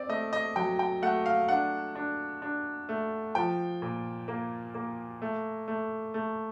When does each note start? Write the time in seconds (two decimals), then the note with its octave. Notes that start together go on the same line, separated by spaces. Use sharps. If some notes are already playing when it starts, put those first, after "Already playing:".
Already playing: C4 D5
0.09 A3 D#5
0.33 D#5
0.56 F#3 G5
0.79 G5
1.02 A3 F#5
1.26 F5
1.49 D4 F#5
1.95 D4
2.42 D4
2.89 A3
3.35 F3 G5
3.82 A#2
4.28 A#3
4.74 A#3
5.22 A3
5.68 A3
6.14 A3